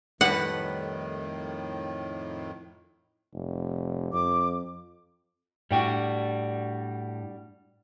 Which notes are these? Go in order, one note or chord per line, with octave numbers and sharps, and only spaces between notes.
F2 A2 D#3 G3 B4 F#5 A5
F1
F2 D6
A2 G3 D4 F#4 G5